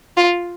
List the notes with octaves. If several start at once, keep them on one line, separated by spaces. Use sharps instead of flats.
F4